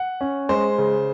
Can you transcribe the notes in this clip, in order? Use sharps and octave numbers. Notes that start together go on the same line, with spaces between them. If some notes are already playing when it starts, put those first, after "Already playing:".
Already playing: F#5
C#4
G#3 C5
C#3